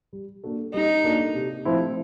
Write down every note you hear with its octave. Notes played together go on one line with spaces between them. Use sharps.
G3
A#3 D4 F#4 A4
G3 D#4
A#3 D4 F#4 A4
C3
F3 A3 C4 E4